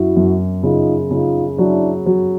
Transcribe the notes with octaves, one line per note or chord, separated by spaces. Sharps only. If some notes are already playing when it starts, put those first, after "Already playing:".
Already playing: F#2 E4 F#4
F#2
C#3 D#4 F4
C#3 D#4 F4
F#3 D4 E4
F#3